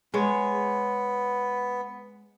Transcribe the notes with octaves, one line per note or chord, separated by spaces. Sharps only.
G#3 B3 C#5